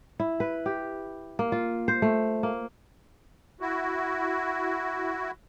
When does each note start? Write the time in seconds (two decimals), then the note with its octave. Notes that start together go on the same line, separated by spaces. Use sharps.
0.20 E4
0.40 B4
0.66 G4
1.39 A#3
1.52 F4
1.88 C5
2.02 A3
2.43 A#3
3.61 E4 F#4